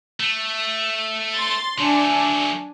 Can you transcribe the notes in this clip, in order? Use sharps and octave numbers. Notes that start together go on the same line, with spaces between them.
A3
C6 A6
F#3 A3 D4 G#5